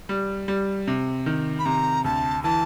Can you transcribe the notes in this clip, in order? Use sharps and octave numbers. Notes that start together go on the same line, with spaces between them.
G3
G3
C3
D#3
B5
C3 A#5
D2 A5
E3 A5